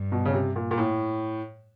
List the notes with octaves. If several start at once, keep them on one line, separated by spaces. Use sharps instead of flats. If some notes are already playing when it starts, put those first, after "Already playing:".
Already playing: G2
B2
C#3
C3
A#2
A#2
A2